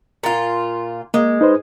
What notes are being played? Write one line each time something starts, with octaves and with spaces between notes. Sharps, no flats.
A#2 F4
G#3 A#3
D#4 B4 C5